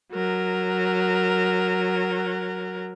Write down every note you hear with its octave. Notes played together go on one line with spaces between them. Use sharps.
F#3 A#4